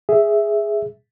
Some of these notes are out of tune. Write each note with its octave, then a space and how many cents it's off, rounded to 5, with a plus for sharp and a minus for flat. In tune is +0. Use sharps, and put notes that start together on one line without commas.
G#4 +0 E5 +0